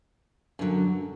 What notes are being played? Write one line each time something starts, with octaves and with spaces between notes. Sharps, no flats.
F#2 D3 F#3